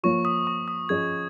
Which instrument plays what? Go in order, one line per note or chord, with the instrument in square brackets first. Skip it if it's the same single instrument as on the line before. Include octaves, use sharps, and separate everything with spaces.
[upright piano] F3 A#3 F4 C#5 [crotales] C#6
[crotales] D#6
C#6
D#6
[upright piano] F3 C#4 G#4 D#5 [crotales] G#6